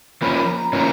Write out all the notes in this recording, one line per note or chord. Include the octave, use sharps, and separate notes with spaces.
F3 A#3 C#4 B5
B5
A#5
B5
F3 A#3 C#4 A#5